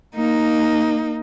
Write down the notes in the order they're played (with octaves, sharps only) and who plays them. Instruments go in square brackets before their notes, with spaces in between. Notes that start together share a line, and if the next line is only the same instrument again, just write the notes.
[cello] A#3 D#4